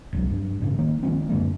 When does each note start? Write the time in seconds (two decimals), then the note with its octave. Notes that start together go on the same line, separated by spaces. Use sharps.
0.13 E1 C2 F#3
0.29 G2
0.60 A1 G2 C#3
0.78 D#3 A#3
1.03 D#3 F3 G#3 C4
1.29 F#2 D3 G#3 A#3